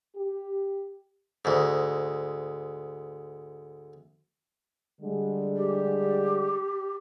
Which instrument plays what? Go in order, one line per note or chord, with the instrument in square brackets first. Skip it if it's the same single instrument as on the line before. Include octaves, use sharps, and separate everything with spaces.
[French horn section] G4
[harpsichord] D2 G#2
[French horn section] D3 G3 G#3
[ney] G4